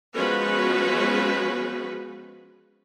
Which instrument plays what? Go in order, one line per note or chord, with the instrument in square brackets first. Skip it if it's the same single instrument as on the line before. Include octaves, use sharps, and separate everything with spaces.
[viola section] F3 G#3 B3 C#4 F#4 B4